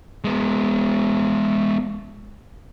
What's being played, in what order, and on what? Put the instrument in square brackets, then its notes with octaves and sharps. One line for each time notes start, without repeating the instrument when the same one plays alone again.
[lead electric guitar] G#3 B3